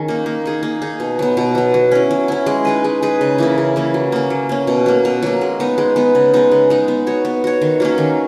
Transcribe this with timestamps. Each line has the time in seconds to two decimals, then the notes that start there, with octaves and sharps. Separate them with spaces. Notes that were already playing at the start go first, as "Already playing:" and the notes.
Already playing: D#3 C#4 G#4
0.08 A#3 D#4
0.26 A#3
0.45 D#4 G#4
0.63 A#3
0.82 D#4 G#4
1.00 B2
1.19 F#3 B3
1.37 B2
1.55 F#3 B3
1.74 F#3
1.91 C#4 E4
2.11 F#3
2.28 C#4 E4
2.46 G#3
2.65 D#4 G#4 B4
2.84 G#3
3.02 D#4 G#4 B4
3.21 C#3
3.38 E3 A#3 E4
3.58 C#3
3.76 E3 A#3 E4
3.94 F#3
4.12 A#3 C#4
4.30 F#3
4.49 A#3 C#4
4.67 B2
4.86 F#3 A#3
5.05 B2
5.23 F#3 A#3
5.41 G#3
5.60 B3 D#4
5.78 G#3
5.96 B3 D#4
6.15 C#3
6.34 G#3 B3 D#4
6.51 C#3
6.70 G#3 B3 D#4
6.88 B3
7.07 F#4 C#5
7.25 B3
7.44 F#4 C#5
7.61 D#3
7.80 F#3 A#3 C#4
7.98 D#3